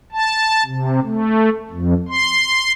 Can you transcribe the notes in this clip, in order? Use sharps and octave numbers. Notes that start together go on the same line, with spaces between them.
A5
C3
A3
F2
C6